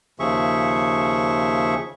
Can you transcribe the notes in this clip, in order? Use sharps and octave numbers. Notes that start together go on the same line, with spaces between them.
D#2 C#3 F3 G#4 E5 C#6